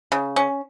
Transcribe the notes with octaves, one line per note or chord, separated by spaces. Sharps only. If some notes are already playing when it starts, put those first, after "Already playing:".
C#3
C#4